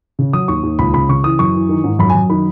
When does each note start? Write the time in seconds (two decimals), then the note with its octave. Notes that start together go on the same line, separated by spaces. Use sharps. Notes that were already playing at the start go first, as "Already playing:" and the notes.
0.19 C#3
0.33 F#3 D#6
0.48 D#2 C#6
0.63 D#2
0.79 C#2 B5
0.93 C#3 B5
1.09 C#3 C#6
1.24 E3 D#6
1.39 F#2 C#6
1.54 E3
1.69 D#3
1.84 G#2
1.99 F#2 B5
2.10 G#5
2.15 F#2
2.30 D#3 B5